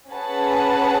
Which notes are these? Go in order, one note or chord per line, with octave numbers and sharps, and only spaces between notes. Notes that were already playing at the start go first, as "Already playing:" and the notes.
C#4 G#4 B4 F#5 A5